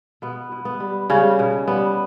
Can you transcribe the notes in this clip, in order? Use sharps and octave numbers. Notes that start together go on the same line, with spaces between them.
B2 B3
B2
B3
G3
C#3 G3 C#4
B2
G3 B3